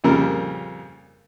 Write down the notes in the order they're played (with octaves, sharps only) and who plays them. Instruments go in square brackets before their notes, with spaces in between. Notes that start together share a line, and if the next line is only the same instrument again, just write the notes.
[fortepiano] A#1 F2 C#3 G3 A#4